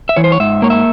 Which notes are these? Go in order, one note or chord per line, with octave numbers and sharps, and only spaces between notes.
E5
E3 C#5
C5
C#5
G#2 E5
A#3 C#5
E5